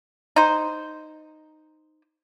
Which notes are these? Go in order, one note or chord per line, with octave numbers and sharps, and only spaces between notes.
D#4 C5